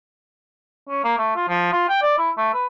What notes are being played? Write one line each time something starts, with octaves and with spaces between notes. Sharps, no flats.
C#4
A#3
A3
F4
F3
F4
G5
D5
E4
A3
B4